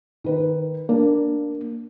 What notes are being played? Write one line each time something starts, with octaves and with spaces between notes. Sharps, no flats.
D#3 B4
A#3 D4